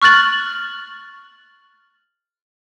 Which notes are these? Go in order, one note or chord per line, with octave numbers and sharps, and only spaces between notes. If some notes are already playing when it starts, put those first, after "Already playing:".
C#6 F6 F#6 A6 F#7